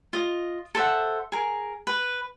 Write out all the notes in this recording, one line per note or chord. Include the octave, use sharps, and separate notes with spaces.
F4 D#5
A4 C5 E5 F#5
G#4 A#4
B4